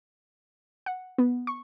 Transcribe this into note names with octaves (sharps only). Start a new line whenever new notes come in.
F#5
B3
C#6